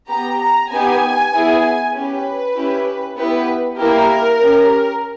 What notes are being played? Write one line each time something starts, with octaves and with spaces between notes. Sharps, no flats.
B3 G4 A#5
A#5
B3 D#4 G4 G#5
B3 E4 G#4
C#4 G4 B4
C#4 E4 G4
B3 E4 G4 B4
A#3 E4 G4 A#4
C#4 G4